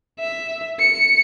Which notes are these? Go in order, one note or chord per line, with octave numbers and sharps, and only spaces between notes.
E5
C#7